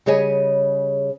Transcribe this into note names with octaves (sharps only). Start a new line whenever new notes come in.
C#3 G3 G#4 C#5 D#5 G#5